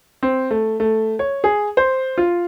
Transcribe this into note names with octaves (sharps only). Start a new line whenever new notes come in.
C4
A3
A3
C#5
G#4
C5
F4